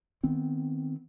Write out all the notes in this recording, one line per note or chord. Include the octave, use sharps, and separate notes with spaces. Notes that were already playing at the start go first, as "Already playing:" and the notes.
D#3 B3 C4